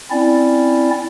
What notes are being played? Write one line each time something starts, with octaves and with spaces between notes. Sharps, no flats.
C4 C#4 E4 D5